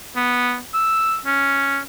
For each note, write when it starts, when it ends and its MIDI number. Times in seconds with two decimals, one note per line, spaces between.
0.16 0.58 59
0.74 1.17 88
1.25 1.79 61